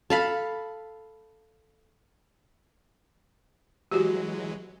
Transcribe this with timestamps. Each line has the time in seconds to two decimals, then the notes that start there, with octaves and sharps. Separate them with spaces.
0.10 A4 F5 B5
3.91 E3 F#3 G#3 F#4 G4